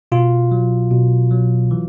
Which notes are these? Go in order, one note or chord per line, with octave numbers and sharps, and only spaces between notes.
B2 F4
F#3
B2
F#3
E3